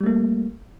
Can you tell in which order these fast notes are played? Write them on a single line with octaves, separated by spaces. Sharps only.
G3 A3 A#3